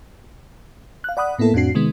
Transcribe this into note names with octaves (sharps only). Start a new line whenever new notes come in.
F5 F#6
D5 F#5 B5 D#6 F#6
A2 A#3 B3 E4 A4
F2 A2 C4 D4 F#4 C7
C3 D#3 G#3 B3